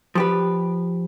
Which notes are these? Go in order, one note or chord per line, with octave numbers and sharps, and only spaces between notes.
F3 G4 B4